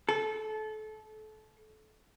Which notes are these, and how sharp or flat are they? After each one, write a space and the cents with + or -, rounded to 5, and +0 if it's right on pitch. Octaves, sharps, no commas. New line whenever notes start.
A4 -25